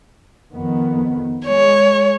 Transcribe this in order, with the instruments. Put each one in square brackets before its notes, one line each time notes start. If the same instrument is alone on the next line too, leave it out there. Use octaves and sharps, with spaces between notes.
[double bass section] F2 D#3 B3
[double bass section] G#3 [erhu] C#5